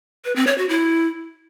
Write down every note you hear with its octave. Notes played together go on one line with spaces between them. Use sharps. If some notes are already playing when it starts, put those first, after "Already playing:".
B4
C4
C#5
F#4
E4